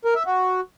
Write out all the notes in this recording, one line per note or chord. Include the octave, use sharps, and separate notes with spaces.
A#4
E5
F#4